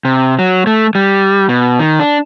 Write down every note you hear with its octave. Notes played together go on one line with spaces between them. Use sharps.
C3
F#3
A3
G3
B2
D#3
D4